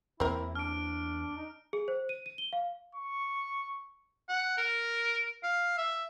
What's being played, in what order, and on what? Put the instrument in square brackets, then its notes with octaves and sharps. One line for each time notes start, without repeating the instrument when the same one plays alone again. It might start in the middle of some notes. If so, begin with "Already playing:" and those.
[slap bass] E2 A#3 [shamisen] C4 A#4 [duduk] E4
[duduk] D4 [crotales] F6 D7
[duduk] D#4
[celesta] G#4
C5
D#7
D#7
G7
F5
[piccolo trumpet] C#6
[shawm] F#5
A#4
F5
E5